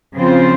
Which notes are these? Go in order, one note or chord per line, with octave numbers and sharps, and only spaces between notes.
C#3 F3 C4 F4 C5